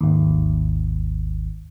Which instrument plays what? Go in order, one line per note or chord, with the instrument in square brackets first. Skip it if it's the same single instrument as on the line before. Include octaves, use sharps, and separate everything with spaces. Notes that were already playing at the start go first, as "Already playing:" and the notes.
[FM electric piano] G#1 D#2